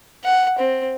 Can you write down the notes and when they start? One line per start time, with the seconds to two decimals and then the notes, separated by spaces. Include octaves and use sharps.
0.24 F#5
0.59 C4